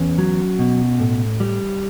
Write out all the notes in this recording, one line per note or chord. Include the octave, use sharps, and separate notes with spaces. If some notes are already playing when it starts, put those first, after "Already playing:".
Already playing: E2 C#4
F#3
B2
A2
G3